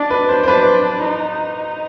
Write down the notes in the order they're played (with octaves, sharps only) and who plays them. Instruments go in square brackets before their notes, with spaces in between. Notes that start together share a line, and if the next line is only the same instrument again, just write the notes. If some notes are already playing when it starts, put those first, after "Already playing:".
Already playing: [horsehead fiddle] D4 [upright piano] D5
[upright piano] B4
C5
C5
[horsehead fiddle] D4 [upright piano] B4
[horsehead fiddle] D#4